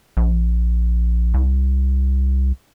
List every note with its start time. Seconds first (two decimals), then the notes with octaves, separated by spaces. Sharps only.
0.17 A#1
1.34 C2